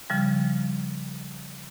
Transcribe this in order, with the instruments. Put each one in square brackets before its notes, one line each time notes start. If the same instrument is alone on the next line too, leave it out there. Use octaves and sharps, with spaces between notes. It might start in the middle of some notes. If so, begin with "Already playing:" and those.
[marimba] C#3 F3 G3